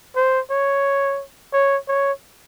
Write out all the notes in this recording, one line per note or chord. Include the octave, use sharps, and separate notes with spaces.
C5
C#5
C#5
C#5